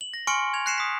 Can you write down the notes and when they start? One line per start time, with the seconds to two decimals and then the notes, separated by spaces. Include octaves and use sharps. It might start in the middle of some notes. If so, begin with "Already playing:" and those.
0.01 F#7
0.14 A#6
0.27 G#5 C6 C#6 F6 C#7 D7
0.54 G#6 F7
0.66 F#6 A#6 C7 C#7 E7
0.78 D#6 B6